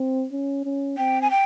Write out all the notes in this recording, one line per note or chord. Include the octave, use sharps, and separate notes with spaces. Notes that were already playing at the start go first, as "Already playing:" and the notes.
Already playing: C4
C#4
C#4
C4 G5
G#5
G5